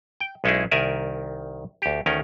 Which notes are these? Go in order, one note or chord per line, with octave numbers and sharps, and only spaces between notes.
G5
B1 G#3 C#4 D#4 E4 G#4
C2 D#3 A#4 D5 E5 G#5
D2 G4
D2 D#3 C#4 A#4